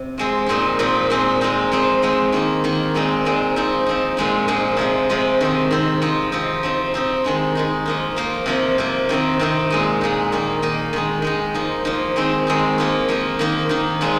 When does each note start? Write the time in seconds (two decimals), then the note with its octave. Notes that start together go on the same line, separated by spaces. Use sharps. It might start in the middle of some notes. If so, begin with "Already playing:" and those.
Already playing: C3
0.18 F3 G#3 C4
0.46 A#2 F3 C4 D#4
0.79 A#2 F3 C4 D#4
1.10 A#2 G#3 C4 D#4
1.41 A#2 G#3 C4 D#4
1.72 F3 G#3 C4 D#4
2.02 F3 G#3 C4 D#4
2.32 D#3 A#3 D#4
2.64 D#3 A#3 D#4
2.94 A#2 G#3 C4 D#4
3.25 A#2 G#3 C4 D#4
3.56 F3 C4 D#4
3.86 F3 C4 D#4
4.17 A#2 F3 G#3 D#4
4.48 A#2 F3 G#3 D#4
4.77 C3 F3 G#3
5.09 C3 F3 G#3
5.41 D#3 C4 D#4
5.71 D#3 C4 D#4
6.02 F3 C4 D#4
6.32 F3 C4 D#4
6.63 F3 C4 D#4
6.94 F3 C4 D#4
7.24 D#3 G#3 D#4
7.55 D#3 G#3 D#4
7.86 F3 A#3 D#4
8.16 F3 A#3 D#4
8.46 C3 F3 A#3
8.78 C3 F3 A#3
9.09 C3 D#3 C4 D#4
9.39 C3 D#3 C4 D#4
9.70 A#2 G#3 D#4
10.01 A#2 G#3 D#4
10.32 D#3 A#3 D#4
10.62 D#3 A#3 D#4
10.93 D#3 G#3 D#4
11.22 D#3 G#3 D#4
11.54 F3 A#3 D#4
11.85 F3 A#3 D#4
12.16 D#3 G#3 C4 D#4
12.47 D#3 G#3 C4 D#4
12.78 F3 A#3 D#4
13.08 F3 A#3 D#4
13.39 D#3 A#3 D#4
13.69 D#3 A#3 D#4
14.01 A#2 F3 G#3 D#4